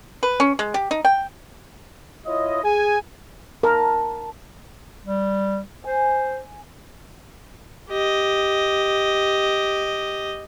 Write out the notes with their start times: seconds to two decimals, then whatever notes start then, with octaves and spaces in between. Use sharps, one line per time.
0.23 B4
0.40 C#4
0.59 G#3
0.74 G4
0.91 D#4
1.05 G5
2.26 E4 F4 C#5 D#5
2.64 G#4 G#5
3.63 A#4 A5
5.05 G3
5.84 C5 G#5
7.90 G4 D#5